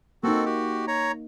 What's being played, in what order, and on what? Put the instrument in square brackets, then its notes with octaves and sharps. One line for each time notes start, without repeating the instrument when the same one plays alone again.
[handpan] A#3 D#4 [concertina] C4 F#4 A4
[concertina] F#4 G4
C#5 A#5